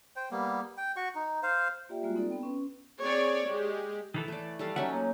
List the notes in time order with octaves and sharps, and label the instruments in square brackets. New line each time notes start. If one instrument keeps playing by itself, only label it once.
[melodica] C5 G5
G3 A#3 B3
G5
F#4 C#6
D#4
C5 F5
[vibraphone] A#3 F4 G4 D5 E5 G5
G3 G#3 A#3 F4 F#4
C4 D#4 A4 D5
B3 G5
C#4 B4 C6
[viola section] C4 G#4 C#5 D5
G#3 G4
[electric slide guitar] D#3 E3 A4
[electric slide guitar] E3 [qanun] A3 D5
[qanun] G3 A4 F5
[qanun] F#3 C#4 D#4 [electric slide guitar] E5 F#5
[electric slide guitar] A#3